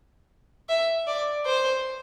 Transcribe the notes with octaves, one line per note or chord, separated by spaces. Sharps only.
E5
D5
C5